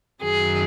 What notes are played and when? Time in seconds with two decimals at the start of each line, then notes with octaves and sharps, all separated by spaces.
0.22 F#2 D#3 F#3 G#4